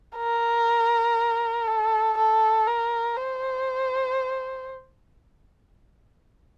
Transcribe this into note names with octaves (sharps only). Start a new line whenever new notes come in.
A#4
A4
A4
A#4
C5